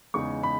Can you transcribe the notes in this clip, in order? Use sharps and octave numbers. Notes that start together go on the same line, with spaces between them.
E2 C#3 G#3 D#4 C#6
B5